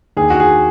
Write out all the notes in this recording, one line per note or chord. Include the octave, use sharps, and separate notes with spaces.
D#2 G#4
F#4
G#4